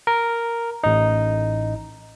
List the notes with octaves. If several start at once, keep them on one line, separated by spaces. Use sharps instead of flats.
A#4
A1 D#4